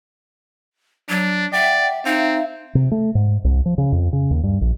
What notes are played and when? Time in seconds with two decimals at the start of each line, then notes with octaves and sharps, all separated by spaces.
1.09 F#3 D4
1.53 D5 E5 F#5 G5
2.05 C4 D#4 E5 F5
2.75 C3
2.91 A3
3.15 G#2
3.44 C2
3.66 F3
3.78 C#3
3.92 F2
4.13 C#3
4.31 D#2
4.43 G2
4.61 A#1